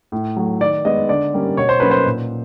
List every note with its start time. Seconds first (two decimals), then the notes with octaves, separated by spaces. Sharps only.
0.12 A2
0.36 F#3 A3
0.61 D#3 D5
0.85 G#3 B3 D#5
1.09 D3 D5
1.34 G3 A#3 C#4
1.57 B2 C#5
1.69 C5
1.80 F#3 A#3 C#4 B4
1.91 C5
2.06 A#2